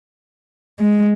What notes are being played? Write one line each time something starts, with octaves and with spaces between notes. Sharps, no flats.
G#3